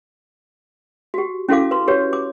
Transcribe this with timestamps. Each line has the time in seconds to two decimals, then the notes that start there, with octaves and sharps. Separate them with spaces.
1.14 F#4 G4
1.49 C#4 E4 F#4 A4 F5 D6
1.71 B4 C6
1.88 F#4 G4 B4 C#5
2.13 D6